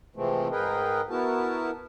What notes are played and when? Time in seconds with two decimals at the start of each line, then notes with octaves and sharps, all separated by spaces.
0.16 C3 E3 F3 G#3 A3 C4
0.52 G#2 G#4 A#4 B4 D#5 G5
1.10 B3 E4 F#4 A#4 A5